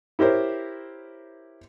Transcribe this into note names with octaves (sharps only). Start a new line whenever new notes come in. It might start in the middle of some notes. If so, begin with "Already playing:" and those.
E4 G4 A#4 C5 C#5